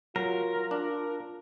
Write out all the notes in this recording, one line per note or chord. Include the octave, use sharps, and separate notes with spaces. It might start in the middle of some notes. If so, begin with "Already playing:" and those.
F#3 F4 A#4
D4